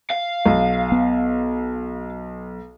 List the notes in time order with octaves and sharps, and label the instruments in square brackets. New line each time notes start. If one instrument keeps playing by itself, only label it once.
[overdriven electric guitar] F5
[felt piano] B1
[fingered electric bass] B3